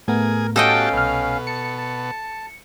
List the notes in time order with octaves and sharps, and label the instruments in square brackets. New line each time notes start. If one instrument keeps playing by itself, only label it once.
[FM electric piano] A2 A3 B3 [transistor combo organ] G#4 [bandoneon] A#4
[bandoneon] C#4 F5 [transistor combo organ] F#4 G4 A5 [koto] A4 D#5 G5
[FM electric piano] C2 F6 [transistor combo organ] B2
[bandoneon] A5 [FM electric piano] C#7
[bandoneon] A5